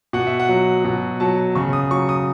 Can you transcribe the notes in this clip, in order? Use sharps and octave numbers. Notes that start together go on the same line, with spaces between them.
B2 F#5
E5
F#5
F#3
B2
F#3 A5
C#3 C#6
D#6
F#3 C#6
D#6